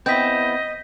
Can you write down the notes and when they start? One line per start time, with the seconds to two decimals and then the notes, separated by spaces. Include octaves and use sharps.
0.06 B3 C4 E4 D#5 G6 B6